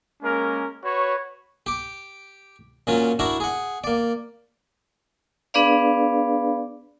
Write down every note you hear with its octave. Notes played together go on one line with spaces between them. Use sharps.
G#3 A#3 C#4 A#4
F#4 B4 C#5
G4 D6
A#2 F#3 C#4 F4
D4 E4 F#4 A#4
G#4 F#5
A#3 D5
B3 D4 G#4 B4 D5 F5